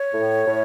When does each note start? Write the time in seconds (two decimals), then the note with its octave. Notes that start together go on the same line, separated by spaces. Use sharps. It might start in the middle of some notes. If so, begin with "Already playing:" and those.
Already playing: C#5
0.13 A2
0.47 A2